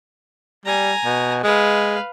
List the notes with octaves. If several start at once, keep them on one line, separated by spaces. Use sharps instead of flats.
G3 G#5 A#5
B2
G#3 B4 F5